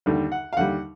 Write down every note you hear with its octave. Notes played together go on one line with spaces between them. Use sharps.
D#2 D3 G3
F#5
F5
D#2 D3 G3 F#5